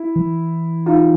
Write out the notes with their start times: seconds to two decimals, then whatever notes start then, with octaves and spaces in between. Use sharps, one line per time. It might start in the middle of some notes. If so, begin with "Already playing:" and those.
Already playing: E4
0.16 E3
0.86 D#4 F4